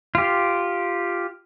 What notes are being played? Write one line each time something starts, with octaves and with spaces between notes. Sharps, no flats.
F4 G4